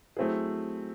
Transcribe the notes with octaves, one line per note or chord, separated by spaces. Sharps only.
F#3 A3 C4 E4 G#4